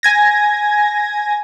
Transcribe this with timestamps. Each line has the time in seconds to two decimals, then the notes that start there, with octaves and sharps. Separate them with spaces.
0.03 G#5 G#6 A#6